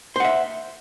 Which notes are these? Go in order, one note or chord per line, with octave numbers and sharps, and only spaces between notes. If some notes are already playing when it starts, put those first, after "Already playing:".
C5 E5 F#5